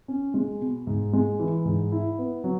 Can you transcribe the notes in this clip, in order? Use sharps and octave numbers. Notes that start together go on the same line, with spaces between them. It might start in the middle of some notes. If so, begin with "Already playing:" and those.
C#4
G#3
B2
G#2
G#3
E3
G#2
E4
B3
F#3